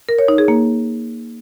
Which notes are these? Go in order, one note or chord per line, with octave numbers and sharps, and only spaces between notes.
A#4
C#5
D#4
G#4
A#3